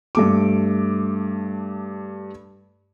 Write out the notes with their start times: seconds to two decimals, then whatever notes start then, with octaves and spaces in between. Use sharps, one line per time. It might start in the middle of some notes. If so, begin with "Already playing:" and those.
0.15 G2 A3 D6